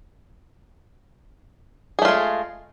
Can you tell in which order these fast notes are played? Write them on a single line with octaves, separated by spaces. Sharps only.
G#4 A3 F4 G#3